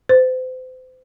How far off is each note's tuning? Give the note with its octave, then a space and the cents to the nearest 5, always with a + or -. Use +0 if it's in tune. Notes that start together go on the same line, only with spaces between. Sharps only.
C5 -35